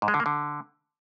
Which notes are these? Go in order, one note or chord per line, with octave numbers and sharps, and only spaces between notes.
G#2
G#3
D3
A#3
D3